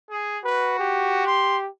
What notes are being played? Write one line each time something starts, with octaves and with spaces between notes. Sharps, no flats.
G#4
F#4 B4
G4
C6